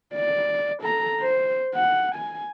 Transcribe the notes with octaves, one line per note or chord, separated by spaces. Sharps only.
D5
A4 A#5
C5
F#5
G#5